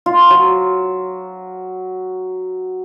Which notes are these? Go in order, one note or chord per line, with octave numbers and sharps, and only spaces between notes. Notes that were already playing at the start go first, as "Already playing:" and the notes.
F4
F#3